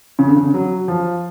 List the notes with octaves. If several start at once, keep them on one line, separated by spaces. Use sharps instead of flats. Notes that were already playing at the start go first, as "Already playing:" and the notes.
C#3
D3
C#3
F#3
F3